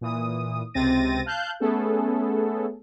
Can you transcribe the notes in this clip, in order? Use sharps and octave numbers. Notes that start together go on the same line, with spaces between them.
A#2 E3 D#6
C#2 C3 C4 A6 A#6 D#7
F5 A5 F#6 G6
A3 B3 C#4 G#4 A4